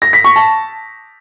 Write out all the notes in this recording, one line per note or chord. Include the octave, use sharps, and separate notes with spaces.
A#6
B6
C#6
A5